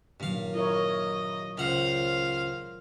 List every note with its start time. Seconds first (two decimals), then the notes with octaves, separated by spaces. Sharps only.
0.20 G2 A#2 D#3 F#3 F5
0.55 E4 A#4 C#5 D#5
1.58 C#2 C5 F5 F#5